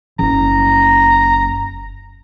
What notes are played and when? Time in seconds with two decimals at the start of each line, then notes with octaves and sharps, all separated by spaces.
0.19 F#1 A#5